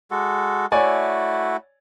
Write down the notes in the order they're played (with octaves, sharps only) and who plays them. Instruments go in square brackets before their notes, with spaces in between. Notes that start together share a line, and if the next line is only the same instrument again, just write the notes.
[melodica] G#3 F#4 A4
[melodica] A3 E4 F#4 [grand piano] C#5 D5 G#5